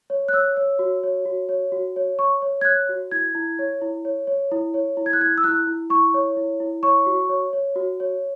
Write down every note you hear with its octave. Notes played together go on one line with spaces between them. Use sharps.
C#5
F#6
C#5 E6
C#5
F#4
C#5
F#4
C#5
F#4
C#5
C#5 C#6
C#5
G#6
C#5 F#6
F#4
E4 G#6
E4
C#5
E4
C#5
C#5
E4
C#5
E4
G#6
F#6
E4 G#6
E6
E4 F#6
E4
E4 C#6
C#5
E4
E4
C#5 C#6
F#4
C#5
C#5
F#4
C#5